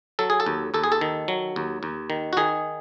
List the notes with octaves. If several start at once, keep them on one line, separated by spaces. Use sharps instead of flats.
F#3 A4
G#4
A4
D#2
D#2 A4
G#4
A4
D#3
F#3
D#2
D#2
D#3
F#4
D#3 G#4